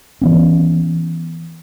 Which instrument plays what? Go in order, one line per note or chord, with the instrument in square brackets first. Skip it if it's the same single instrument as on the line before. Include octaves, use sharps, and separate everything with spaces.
[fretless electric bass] E3 B3 C#4